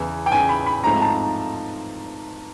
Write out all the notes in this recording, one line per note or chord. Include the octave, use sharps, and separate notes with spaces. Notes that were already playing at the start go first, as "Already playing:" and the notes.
Already playing: E2 C#3 E3
G5
E2 C#3 E3 G#5
B5
B5
G#2 F3 A3 C4 A#5
A5